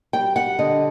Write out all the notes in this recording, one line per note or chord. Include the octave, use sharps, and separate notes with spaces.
G3 G5
F#5
D3 D#5